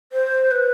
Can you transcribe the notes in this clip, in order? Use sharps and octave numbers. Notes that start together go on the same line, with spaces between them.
C5
B4